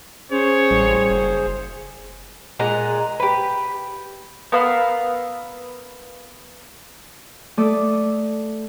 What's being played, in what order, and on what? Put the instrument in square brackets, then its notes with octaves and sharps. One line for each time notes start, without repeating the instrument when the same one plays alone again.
[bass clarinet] C#4 [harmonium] G#4 C5 [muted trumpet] C#5
[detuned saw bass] A1 [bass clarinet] G3
[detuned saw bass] F#1
[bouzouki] A#2 G#3 F#5 A#5
G4 B4
[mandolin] B3 A#4 F5 E6
[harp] A3 A4 D5 D#6